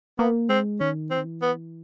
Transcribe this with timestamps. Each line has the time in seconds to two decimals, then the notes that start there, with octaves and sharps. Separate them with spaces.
0.19 A#3 B3
0.49 G#3 C4
0.80 D#3 C#4
1.11 E3 C4
1.18 D#3
1.25 E3
1.42 B3